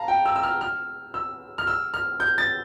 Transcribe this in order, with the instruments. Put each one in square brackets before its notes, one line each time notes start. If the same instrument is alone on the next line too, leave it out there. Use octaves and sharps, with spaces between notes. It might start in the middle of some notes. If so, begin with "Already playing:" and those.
Already playing: [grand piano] F5 A5 A#5
G5
E6
E6
F6
F6
E6
F6
E6
F6
G6
A6